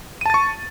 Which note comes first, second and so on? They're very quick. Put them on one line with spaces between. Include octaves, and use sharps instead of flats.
D#7 A5 A6 C#6